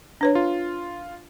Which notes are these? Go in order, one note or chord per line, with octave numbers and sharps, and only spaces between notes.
D4 B4 C#5
F4